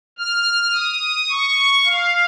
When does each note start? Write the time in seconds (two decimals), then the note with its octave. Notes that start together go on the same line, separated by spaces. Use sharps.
0.18 F6
0.74 D#6
1.29 C#6
1.85 F5